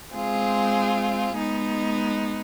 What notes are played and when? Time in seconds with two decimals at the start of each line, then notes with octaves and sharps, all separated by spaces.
0.14 G#3 C4 F4 G#4
1.36 G#3 B3 D#4